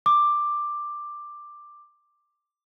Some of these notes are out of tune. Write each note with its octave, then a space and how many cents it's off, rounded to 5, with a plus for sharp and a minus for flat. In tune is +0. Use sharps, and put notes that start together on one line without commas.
D6 +10